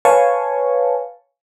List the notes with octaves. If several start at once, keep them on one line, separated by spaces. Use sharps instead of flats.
B4 C#5 F5 G#5 A5 C#6